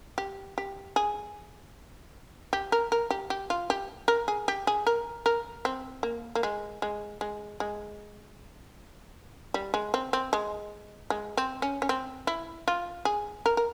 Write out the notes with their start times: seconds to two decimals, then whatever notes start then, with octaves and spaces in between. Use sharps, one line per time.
0.18 G4
0.58 G4
0.96 G#4
2.53 G4
2.72 A#4
2.92 A#4
3.11 G4
3.30 G4
3.50 F4
3.70 G4
4.08 A#4
4.28 G#4
4.48 G4
4.67 G#4
4.87 A#4
5.26 A#4
5.65 C4
6.03 A#3
6.35 A#3
6.43 G#3
6.82 G#3
7.21 G#3
7.60 G#3
9.54 G3
9.74 G#3
9.94 C4
10.13 C4
10.33 G#3
11.10 G#3
11.37 C4
11.62 C#4
11.82 C#4
11.89 C4
12.27 E4
12.68 F4
13.05 G#4
13.46 A#4
13.57 A#4